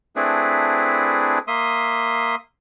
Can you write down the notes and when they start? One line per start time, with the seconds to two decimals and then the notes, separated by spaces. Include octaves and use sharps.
0.16 A3 C4 D4 E4 G#4 B4
1.47 A#3 E5 C6 D#6